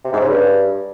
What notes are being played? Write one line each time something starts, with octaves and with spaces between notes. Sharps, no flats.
C3
G#2
C#3
G2